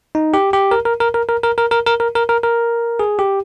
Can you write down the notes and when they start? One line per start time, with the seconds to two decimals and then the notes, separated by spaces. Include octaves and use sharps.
0.15 D#4
0.34 G4
0.53 G4
0.71 A#4
0.85 A#4
1.00 A#4
1.14 A#4
1.29 A#4
1.43 A#4
1.58 A#4
1.71 A#4
1.86 A#4
2.00 A#4
2.15 A#4
2.29 A#4
2.43 A#4
2.99 G#4
3.19 G4